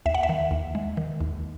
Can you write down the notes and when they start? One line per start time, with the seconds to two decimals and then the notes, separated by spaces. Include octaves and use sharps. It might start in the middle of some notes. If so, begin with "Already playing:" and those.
0.06 D#2 E5
0.14 F#5
0.23 E5
0.29 D#3
0.51 D#2
0.75 G#3
0.97 D#3
1.21 D#2